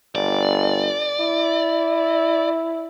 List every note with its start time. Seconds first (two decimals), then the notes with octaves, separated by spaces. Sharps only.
0.15 G1 D5
1.20 E4